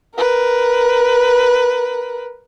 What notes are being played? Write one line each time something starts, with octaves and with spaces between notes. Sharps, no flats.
A#4 B4